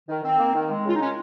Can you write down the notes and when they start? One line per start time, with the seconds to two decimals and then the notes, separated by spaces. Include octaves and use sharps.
0.08 D#3
0.23 D#3 C4
0.38 A#3
0.54 D#3
0.69 G#3
0.84 C#3 F4
0.94 D#4
0.99 G#3 C#4